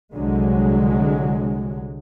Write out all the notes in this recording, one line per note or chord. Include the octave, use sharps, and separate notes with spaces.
C2 D3 F#3 G#3